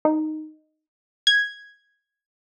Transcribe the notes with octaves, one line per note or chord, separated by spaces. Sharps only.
D#4
G#6